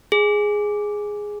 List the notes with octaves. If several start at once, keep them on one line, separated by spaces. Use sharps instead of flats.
G#4